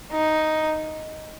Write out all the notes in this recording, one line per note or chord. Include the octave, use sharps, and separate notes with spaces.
D#4